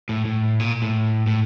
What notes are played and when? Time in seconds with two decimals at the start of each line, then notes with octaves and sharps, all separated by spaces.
0.09 A2
0.25 A2
0.60 A#2
0.82 A2
1.27 A2